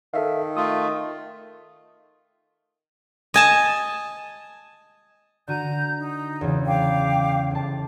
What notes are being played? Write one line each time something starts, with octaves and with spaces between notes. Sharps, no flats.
D#3 A4 E5 F5
A3 F4 D#6
D#5 G#5 A5
D3 F#4 A#5 G6 D#7
D#4
E2 C#3
F5 G5 D6
F1 A5